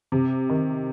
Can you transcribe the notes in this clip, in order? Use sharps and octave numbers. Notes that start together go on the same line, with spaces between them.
C3
D#3